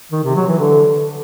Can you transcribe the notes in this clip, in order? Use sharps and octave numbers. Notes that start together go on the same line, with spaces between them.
D#3
C3
F#3
E3
D3